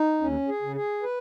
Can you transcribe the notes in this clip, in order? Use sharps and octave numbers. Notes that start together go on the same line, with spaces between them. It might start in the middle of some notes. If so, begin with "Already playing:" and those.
Already playing: D#4
D#2 C#4
G#4
C#3
G#4
B4